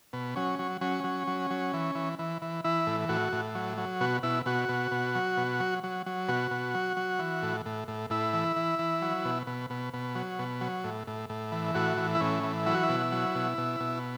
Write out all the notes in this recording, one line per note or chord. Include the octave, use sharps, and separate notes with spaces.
B2
F#3 C#4
F#3
F#3 C#4
F#3
F#3
F#3
E3
E3
E3
E3
E3 E4
A2
A2 F#4
A2
F#3
F#3
B2 F#4
B2 E4
B2 F#4
B2
B2
F#3
B2
F#3
F#3
F#3
B2 F#4
B2
F#3
F#3
E3
A2
A2
A2
A2 E4
E3
E3
E3
F#3
B2
B2
B2
B2
F#3
B2
F#3
A2
A2
A2
E3
A2 F#4
E3
E4
A2 C#4
E3
F#3 E4
F#4
E4
B2
F#3
B2
B2
B2